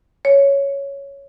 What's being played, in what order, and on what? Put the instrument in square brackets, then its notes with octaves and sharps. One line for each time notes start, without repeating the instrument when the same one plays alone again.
[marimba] C#5